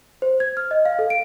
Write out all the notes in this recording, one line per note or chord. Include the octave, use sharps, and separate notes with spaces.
C5
G#6
F6
D#5
F5
A4
D7